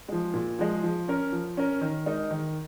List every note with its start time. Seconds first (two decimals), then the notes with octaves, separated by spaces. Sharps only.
0.08 F3 G#3
0.34 A#2
0.59 F3 G#3
0.83 F3
1.08 C#4 A#4
1.32 F3
1.57 C#4 A#4
1.81 D#3
2.06 G#3 D#4 A#4 D#5
2.31 D#3